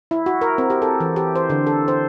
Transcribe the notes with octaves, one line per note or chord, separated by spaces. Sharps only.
E4
F#4
A#4
C4
G4
A4
E3
G4
C5
D3
A4
C5